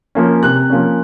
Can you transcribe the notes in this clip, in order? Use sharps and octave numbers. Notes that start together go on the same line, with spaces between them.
F3 A#3 C#4
C3 F#6
F3 A#3 C#4